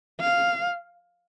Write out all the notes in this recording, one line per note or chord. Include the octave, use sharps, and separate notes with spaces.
F5